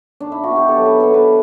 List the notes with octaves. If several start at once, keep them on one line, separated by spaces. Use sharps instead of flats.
D4
E4
F#4
B2
G4
A4
F#3
B4
B2 A4
B4